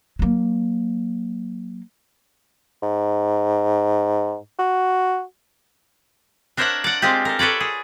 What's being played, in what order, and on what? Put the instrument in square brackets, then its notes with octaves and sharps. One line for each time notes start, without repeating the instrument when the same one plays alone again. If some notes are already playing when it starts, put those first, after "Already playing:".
[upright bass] F#3 A#3
[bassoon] G#2
F#4
[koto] D4 A#4 C5 C#5 E5 F#5
D5 F#5
G#3 C4 F4 G4
A4 A#4
A4 B4 C#5 D5
G#4